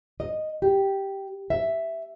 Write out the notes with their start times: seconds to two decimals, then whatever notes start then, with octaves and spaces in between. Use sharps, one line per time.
0.20 D#5
0.62 G4
1.50 E5